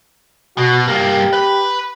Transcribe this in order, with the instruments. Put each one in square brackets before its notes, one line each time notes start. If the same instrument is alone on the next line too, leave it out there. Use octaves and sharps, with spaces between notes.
[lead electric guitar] B2 [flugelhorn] F#4
[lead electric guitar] G2 A#3 [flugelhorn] G4
[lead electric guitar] B4 B5